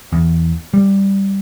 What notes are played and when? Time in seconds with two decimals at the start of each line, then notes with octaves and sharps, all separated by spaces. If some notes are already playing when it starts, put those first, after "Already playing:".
0.12 E2
0.74 G3